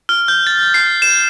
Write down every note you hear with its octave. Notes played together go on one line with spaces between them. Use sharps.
F6
G6
A6
C7
E7